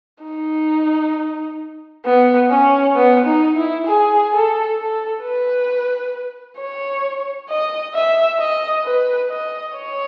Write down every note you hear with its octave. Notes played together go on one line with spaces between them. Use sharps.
D#4
B3
C#4
B3
D#4
E4
G#4
A4
A4
B4
C#5
D#5
E5
D#5
B4
D#5
C#5